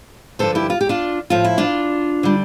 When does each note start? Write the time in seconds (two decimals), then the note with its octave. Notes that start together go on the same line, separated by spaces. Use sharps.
0.39 G2 D3 F3 A4 C5
0.55 E4 G4
0.70 F4
0.81 G4
0.89 D4 F4
1.30 A2 F3 F4
1.44 E4
1.58 D4 F4
2.23 D3 G3